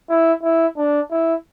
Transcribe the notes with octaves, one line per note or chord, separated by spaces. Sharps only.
E4
E4
D4
E4